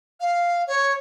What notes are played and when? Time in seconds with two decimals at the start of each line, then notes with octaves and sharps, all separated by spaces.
0.20 F5
0.67 C#5